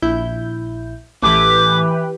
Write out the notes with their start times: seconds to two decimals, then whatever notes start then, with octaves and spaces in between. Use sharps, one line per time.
0.02 A#1 E4 G6
1.22 A1 E3 A3 G4 B4 D6 G#6